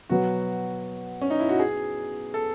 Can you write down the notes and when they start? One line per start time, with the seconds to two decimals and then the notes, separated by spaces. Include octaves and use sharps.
0.09 B2 F#3 B3 F#4
1.21 C#4
1.30 D#4
1.40 E4
1.49 F#4
1.60 G#4
2.34 A4